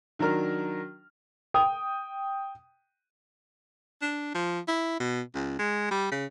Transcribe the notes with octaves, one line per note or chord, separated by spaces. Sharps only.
D#3 F#3 D4 A#4 F6
G5 D#6
D4
F3
E4
B2
C#2
G#3
G3
C#3